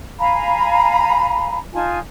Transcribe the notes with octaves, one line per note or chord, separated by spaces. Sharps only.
F5 G#5 A#5 B5
D#4 F4 G#5 A5